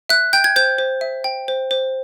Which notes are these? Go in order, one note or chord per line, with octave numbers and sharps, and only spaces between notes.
E5 F#6
G5 G6
G#6
C5 G6
C5
E5
G5
C5
C5